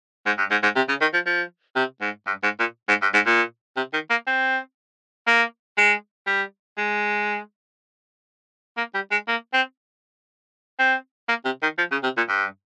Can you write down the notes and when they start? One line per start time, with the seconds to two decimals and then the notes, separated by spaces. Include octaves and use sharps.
0.26 G#2
0.38 G2
0.51 G#2
0.63 G#2
0.76 C3
0.89 C#3
1.01 D#3
1.13 F3
1.26 F3
1.76 C3
2.01 G#2
2.27 G2
2.43 G#2
2.59 A#2
2.88 G#2
3.02 G2
3.14 G#2
3.26 A#2
3.77 C3
3.93 D#3
4.10 A#3
4.27 C4
5.27 A#3
5.77 G#3
6.27 G3
6.78 G#3
8.77 A#3
8.94 G3
9.11 G#3
9.28 A#3
9.53 C4
10.79 C4
11.28 A#3
11.45 C3
11.63 D#3
11.78 F3
11.92 C#3
12.03 C3
12.17 A#2
12.29 G2